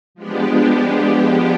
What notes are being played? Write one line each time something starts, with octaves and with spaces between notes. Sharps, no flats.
F3 G#3 B3 D4 G4